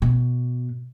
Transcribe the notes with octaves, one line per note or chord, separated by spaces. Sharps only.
B2